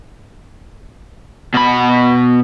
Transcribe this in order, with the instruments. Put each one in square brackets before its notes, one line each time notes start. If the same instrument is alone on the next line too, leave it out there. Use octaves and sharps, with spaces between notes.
[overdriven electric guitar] B2 B5